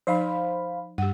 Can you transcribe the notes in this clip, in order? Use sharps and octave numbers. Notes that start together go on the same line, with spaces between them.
F3 D#4 C5 F5 B5
G2 G4 F#5